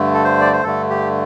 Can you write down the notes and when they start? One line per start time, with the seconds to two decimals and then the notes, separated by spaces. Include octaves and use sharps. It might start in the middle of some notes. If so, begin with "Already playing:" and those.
Already playing: G2 D3 A3
0.14 A4
0.24 C5
0.41 D5
0.53 C5
0.64 G2 D3 A3 A4
0.90 G4